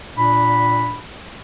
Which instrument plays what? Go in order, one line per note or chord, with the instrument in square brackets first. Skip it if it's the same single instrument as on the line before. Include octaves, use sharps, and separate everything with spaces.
[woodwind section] A#2 D4 B5